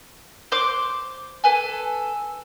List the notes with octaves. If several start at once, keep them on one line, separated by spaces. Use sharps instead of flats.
C5 C6 D6 F#6
A4 B4 G#5